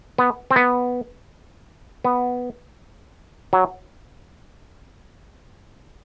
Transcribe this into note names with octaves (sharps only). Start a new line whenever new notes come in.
B3
C4
B3
B3
F#3